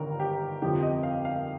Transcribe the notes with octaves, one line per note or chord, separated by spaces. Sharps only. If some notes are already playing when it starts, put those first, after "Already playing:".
Already playing: G1 G2 D#3 A#4
G4
G1 F2 C3 F3 G4
D#5
F5
F5